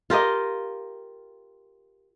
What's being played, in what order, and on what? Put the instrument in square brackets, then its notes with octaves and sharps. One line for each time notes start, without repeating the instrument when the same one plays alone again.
[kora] F4 G4 A#4 D#5